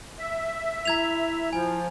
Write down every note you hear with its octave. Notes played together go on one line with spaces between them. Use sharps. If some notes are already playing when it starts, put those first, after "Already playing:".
E5
E4 A#5 G#6 F7
F3 G#5